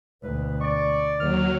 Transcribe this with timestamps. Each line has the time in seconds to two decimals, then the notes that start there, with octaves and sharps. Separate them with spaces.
0.23 D2 B2 B4
0.61 D5 C#6
1.20 D#2 D3 F#3 F6